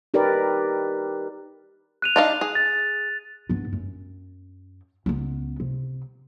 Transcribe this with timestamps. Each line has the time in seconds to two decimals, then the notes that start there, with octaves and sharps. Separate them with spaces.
0.14 D#4 G4 A#4 B4 D5
2.02 F#6 D#7 F7
2.16 D4 D#4 F5
2.41 G#4
2.55 A6
3.49 G2 B3
3.73 F#2
5.06 C#2 B3
5.60 C3